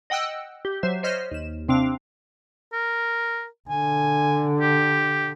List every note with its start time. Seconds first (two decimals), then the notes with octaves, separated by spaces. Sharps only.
0.10 D#5 F#5 G5 E6 F#6
0.65 G4
0.83 F#3 C5 E5
1.03 C5 C#5 D#5 F6 B6
1.32 D#2 E7
1.68 C3 C4 D4 F5
2.73 A#4
3.69 D3 G#5
4.61 G4